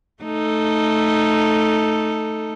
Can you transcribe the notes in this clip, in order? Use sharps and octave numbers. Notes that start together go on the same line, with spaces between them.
A3 D#4 A4